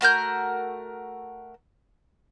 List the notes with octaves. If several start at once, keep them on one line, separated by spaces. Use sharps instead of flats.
A3 F#4 A#4 G6